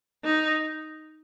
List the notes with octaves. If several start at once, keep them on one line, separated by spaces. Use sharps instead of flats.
D#4